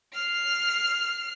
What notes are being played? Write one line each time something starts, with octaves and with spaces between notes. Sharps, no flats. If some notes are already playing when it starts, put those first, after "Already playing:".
F6 C7